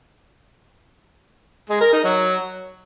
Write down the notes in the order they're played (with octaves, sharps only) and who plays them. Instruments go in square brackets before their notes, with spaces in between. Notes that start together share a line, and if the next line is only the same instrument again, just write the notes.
[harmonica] G#3
A#4
D#4
F#3